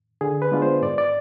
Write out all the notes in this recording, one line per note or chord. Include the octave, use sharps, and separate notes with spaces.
D3 G#4
B4
G#3 B3 D4 F4
C5
G#2 D5
D5